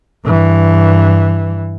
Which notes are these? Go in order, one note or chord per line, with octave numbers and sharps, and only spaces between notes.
G2 E3